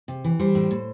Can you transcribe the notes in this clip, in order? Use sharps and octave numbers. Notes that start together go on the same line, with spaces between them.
C3
E3
G3 C5
A2
A2